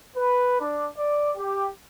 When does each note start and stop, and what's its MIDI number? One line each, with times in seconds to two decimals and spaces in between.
0.17 0.58 71
0.59 0.86 62
0.98 1.31 74
1.37 1.67 67